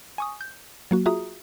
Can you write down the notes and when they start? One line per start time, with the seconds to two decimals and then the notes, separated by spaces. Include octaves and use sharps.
0.18 G#5 C#6 D#6
0.41 G6
0.91 F#3 A#3 F#4
1.06 F4 F#4 G#4 E5 A#5 D#6